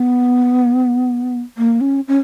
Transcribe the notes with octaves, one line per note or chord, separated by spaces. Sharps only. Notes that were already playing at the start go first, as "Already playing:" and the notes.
Already playing: B3
A#3
C#4
C#4